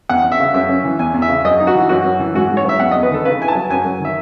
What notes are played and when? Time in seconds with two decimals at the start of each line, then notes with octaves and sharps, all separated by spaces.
0.09 E2 F#5
0.24 E2
0.32 E5
0.40 C#3
0.54 F#2 E5
0.69 C#4
0.84 E3
0.99 E2 G#5
1.14 E2
1.22 E5
1.29 C#3
1.45 F#2 D#5
1.60 D#4
1.67 F#4
1.75 E3
1.89 F#2 F#4
2.05 F#2
2.20 E3
2.35 G#2 F#4
2.50 G#2
2.57 C#5
2.65 F#3 E5
2.80 E2 F#5
2.91 D#5
2.95 E2
3.03 B4
3.10 D#3 A4
3.25 C#3 B4
3.40 E4 G#5
3.48 A5
3.55 F#3
3.70 F#2 G#5
3.85 F#2
4.00 D#3 E5